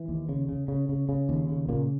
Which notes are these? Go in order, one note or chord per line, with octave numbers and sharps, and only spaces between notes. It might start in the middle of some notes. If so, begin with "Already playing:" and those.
Already playing: E3
D#2
C#3
C#3
C#3
C#3
C#3
D#2
C#3
A#2 C#3 A#3